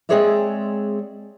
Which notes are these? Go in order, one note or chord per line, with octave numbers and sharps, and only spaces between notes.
G#3 C4 G#4 C#5 D5 E5